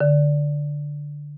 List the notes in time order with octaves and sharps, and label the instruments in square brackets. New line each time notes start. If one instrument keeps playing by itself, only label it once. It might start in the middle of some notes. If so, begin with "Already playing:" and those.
[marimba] D3